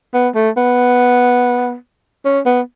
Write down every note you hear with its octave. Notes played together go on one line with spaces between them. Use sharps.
B3
A3
B3
C#4
B3